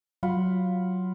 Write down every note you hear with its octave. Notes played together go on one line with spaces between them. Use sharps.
F#3 F4 F#5 B5